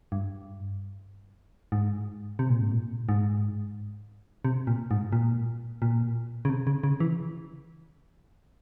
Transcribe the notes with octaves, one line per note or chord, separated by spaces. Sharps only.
G2
G#2
C3
A#2
G#2
A#2
G#2
C3
A#2
G#2
A#2
A#2
C#3
C3
C#3
C#3
E3